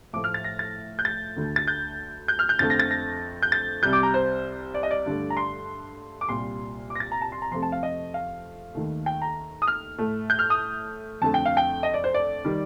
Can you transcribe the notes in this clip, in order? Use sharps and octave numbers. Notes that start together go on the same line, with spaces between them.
A2 F3 A3 D6
F6
A6
A#6
A6
G6
A6
D2 D3 A3
A6
G6
G6
F6
G6
F2 D3 F3 A3 A6
A#6
A6
A#6
G6
A6
C2 C3 G3 G6
D6
A#5
C5
D5
D#5
D5
G2 D3 A3
A#5
C6
D6
C2 A#2 G3 C6
D6
A#6
A6
A#5
A5
C6
A#5
F2 C3 F3 A3 C6
A5
F5
D#5
F5
D#2 D#3 A3
G5
A#5
D#6
F6
A2 A3
G6
F6
D#6
F2 D3 A3 A5
G5
F5
G5
D#5
D5
C5
D5
D#3 G3